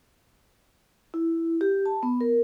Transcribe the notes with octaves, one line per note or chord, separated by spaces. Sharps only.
E4
G4
A5
B3
A#4